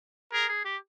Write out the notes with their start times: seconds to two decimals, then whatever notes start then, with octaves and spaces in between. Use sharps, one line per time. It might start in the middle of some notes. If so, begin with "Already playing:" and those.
0.32 G#4 A#4
0.49 G#4
0.65 G4